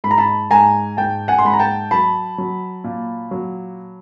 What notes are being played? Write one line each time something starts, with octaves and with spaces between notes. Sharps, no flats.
G#2 B5
A#5
A5 B5
G#2 G#5 A#5
G#2 G5 A5
F#5 G#5
C6
G#2 B5
A#5
G5 A5
F#3 A5 B5
F#3
A#2
F#3